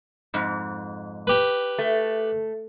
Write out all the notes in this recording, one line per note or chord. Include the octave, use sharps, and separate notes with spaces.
F2 G#2
G4 B4
A3